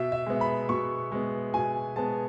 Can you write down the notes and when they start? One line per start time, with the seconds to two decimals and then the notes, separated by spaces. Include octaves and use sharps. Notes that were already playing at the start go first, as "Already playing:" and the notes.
Already playing: B2 E5
0.12 E5
0.26 G#3 B3
0.41 B5
0.69 B2 C#6
1.12 G#3 B3
1.54 B2 G#5
1.96 G#3 B3 A5